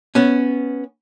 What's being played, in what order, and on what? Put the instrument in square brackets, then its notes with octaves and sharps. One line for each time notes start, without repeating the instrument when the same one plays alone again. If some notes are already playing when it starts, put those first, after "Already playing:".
[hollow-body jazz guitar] B3 C#4